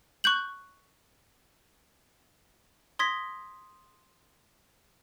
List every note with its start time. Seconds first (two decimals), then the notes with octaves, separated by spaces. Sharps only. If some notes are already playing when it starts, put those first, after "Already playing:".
0.24 C#6 F#6 G6 F#7
2.99 C6 D#6 G#6 A#6 B6